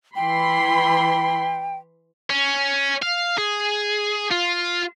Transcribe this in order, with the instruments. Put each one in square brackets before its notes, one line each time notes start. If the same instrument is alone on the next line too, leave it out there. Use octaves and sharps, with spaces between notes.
[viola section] E3 B5 C6 [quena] G5
[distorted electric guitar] C#4
F5
G#4
F4